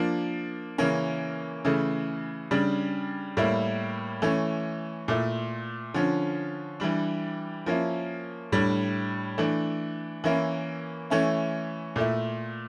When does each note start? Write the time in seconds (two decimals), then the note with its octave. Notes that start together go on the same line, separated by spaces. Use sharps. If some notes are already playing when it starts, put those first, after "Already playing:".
Already playing: F3 A#3 D4
0.78 C#3 E3 A#3 C#4
1.65 C#3 E3 A3
2.51 C#3 G3 D4
3.37 A2 G3 A#3 E4
4.22 E3 A3 C#4
5.08 A#2 A3 E4
5.94 D3 F3 C#4
6.80 E3 G3 D4
7.66 F3 A#3 C#4 E4
8.52 A2 G3 D4
9.38 E3 A3 D4
10.24 E3 A#3 C#4 E4
11.10 E3 A3 C#4 E4
11.96 A#2 A3 E4